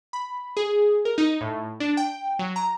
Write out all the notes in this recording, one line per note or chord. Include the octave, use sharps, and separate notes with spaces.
B5
G#4
A#4
D#4
A2
D4
G5
F#3
A#5